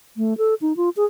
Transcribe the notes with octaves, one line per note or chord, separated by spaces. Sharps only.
A3
A4
D#4
F4
G#4